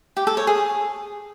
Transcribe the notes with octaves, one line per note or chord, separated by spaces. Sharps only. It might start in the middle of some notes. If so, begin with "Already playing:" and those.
G4
A4
C#5
G#4